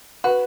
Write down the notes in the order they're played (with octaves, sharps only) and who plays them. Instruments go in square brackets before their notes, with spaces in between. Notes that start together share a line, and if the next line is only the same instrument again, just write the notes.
[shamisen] F#4 [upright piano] B4